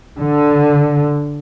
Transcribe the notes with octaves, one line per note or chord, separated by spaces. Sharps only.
D3